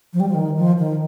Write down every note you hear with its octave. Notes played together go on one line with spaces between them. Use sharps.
F3
G3
F3
D#3
F3
D#3